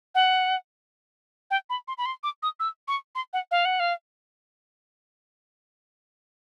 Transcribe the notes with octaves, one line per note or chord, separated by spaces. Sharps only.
F#5
G5
B5
C6
B5
C6
D6
D#6
E6
C#6
C6
F#5
F5
F#5
F5